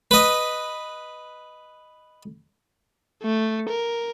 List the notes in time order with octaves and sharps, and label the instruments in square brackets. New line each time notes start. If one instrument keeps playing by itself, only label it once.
[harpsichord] B4 D#5
[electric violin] A3
A#4